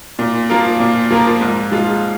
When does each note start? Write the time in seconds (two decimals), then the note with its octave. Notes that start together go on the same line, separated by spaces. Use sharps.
0.19 A#2
0.49 F3 A#3 F4 A#4
0.80 A#2
1.10 F3 A#3 F4 A#4
1.41 G#2
1.72 F3 G#3 F4